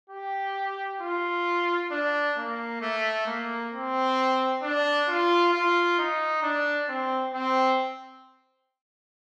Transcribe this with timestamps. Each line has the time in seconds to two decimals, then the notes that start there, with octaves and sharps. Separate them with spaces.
0.10 G4
1.01 F4
1.91 D4
2.37 A#3
2.81 A3
3.26 A#3
3.72 C4
4.62 D4
5.09 F4
5.53 F4
5.99 D#4
6.43 D4
6.89 C4
7.34 C4